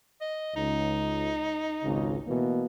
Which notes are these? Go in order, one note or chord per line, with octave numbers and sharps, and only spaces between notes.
D#5
C#2 D#4
G#1 C#2 C#3
B2 E3 A#3